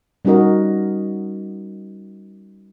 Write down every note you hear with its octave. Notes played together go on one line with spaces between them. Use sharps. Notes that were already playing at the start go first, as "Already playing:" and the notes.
G3 C#4 D#4 F#4 A#4 D#5